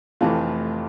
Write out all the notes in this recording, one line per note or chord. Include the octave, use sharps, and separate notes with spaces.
F1 F2 E3 F3 A3 F4